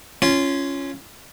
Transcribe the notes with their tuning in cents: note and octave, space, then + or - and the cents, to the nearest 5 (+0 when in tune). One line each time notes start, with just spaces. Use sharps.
C#4 +0 F4 -15